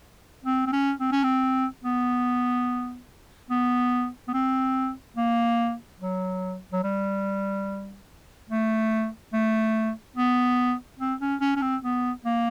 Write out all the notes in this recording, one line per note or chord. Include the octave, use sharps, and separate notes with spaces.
C4
C4
C#4
C4
C#4
C4
B3
B3
B3
C4
A#3
F#3
F#3
G3
A3
A3
B3
C4
C#4
C#4
C#4
C4
B3
A#3